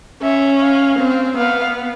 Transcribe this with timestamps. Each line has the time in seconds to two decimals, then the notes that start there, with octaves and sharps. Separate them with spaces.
0.22 C#4 E5
0.61 F5
0.99 C4
1.37 B3 F5